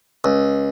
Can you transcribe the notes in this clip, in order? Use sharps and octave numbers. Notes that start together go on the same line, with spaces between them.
C#2